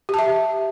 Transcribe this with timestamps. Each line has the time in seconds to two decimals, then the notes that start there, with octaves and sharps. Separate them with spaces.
0.09 G4
0.14 A5
0.19 E5